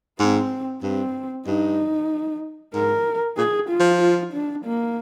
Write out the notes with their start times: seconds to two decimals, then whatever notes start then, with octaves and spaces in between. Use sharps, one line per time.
0.19 G#2 C4
0.83 G2 C4
1.47 G2 D#4
2.74 G#2 A#4
3.37 A#2 G#4
3.69 F4
3.80 F3
4.01 F4
4.33 D4
4.65 A#3